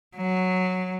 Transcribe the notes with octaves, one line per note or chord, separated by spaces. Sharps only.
F#3